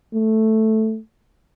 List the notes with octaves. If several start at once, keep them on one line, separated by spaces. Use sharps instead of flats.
A3